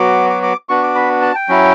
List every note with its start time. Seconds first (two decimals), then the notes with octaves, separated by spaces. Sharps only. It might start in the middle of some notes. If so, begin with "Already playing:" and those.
Already playing: F#3 B3 F#4 D6
0.30 D6
0.43 D6
0.69 B3 D4 F#4 C#6
0.83 D6
0.95 B5
1.22 A5
1.35 G5
1.49 F#3 C#4 E4